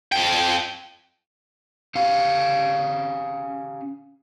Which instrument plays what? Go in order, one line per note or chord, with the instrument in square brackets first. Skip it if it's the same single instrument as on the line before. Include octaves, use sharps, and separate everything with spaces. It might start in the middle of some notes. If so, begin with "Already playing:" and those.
[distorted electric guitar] F2 G5
[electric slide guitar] C#4 G4 F5